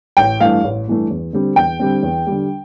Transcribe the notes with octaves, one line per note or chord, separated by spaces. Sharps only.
A1 G5
G2 E3 A3 F5
A1
G2 E3 A3
E2
D3 G3 C4
E2 G5
D3 G3 C4
E2
D3 G3